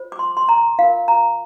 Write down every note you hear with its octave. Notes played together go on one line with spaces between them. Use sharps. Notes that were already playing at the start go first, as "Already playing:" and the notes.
Already playing: F4 C5
D6
C6
C6
A#5
F4 A#4 F5
A#5